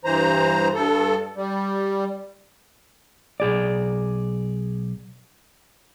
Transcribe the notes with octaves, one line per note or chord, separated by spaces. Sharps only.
G2 E3 C5 A#5
G2 A4
G3
B1 G#4 D5